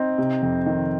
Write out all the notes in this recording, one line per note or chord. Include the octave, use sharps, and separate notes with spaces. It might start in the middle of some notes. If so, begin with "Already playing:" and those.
Already playing: C4 D#4
C3
F2
D#3